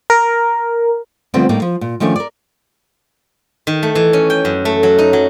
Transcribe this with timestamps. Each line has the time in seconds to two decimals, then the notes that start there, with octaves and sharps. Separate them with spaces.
0.10 A#4
1.34 D3 F3 G3 A3 B3 C4
1.49 A2 G3 A#3 D#4
1.62 F3
1.81 A#2
2.00 D#3 F3 A3 C#4 D4
2.16 A#4 D5
3.67 D#3
3.83 A3
3.95 E3
4.13 C#4
4.30 G5
4.45 F#2
4.65 A3
4.83 F#3
4.98 D#4
5.13 F#3